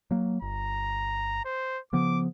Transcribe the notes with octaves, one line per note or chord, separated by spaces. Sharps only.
F#3 A#3
G1 A#5
C5
C#3 F3 B3 D6